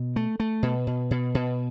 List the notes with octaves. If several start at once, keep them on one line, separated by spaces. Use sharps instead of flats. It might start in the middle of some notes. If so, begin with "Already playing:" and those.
Already playing: B2
A3
A3
B2
B2
B2
B2